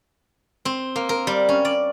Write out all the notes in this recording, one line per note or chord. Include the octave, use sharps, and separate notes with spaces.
C4
A#3
A#4
G3
C#4
D5